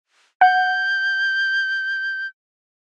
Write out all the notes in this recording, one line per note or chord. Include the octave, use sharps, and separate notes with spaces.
F#5 G6